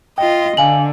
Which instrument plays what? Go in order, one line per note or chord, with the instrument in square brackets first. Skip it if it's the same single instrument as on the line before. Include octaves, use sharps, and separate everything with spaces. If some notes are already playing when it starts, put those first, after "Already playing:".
[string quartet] F4 D#5 [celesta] G5
[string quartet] D3 [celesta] F5 G#5 F#7